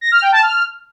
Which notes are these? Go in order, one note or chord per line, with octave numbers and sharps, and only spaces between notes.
A#6
F6
G5
A5
F6